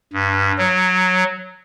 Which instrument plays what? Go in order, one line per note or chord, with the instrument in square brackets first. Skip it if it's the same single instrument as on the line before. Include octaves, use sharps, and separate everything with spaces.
[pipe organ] G2
F#3